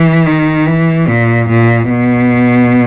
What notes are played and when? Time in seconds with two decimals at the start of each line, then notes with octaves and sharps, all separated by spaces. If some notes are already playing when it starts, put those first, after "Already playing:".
Already playing: E3
0.26 D#3
0.67 E3
1.08 A#2
1.49 A#2
1.90 B2